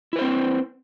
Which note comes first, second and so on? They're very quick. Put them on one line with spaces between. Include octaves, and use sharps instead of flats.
E4 B4 C5 C4